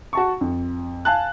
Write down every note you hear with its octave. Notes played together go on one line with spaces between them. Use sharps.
F#4 A5 C#6
F2
F5 G#5 A5 F#6